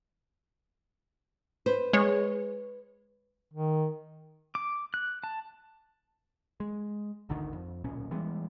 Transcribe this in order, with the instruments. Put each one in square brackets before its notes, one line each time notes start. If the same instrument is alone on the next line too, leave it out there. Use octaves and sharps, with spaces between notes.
[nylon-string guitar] B4 C5
[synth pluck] G#3 C#5
[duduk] D#3
[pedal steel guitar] D6
F#6
A5
[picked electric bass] G#3
G#1 D2 D3 D#3
F2
D1 B1 A#2 C#4
E3 G3 G#3 B3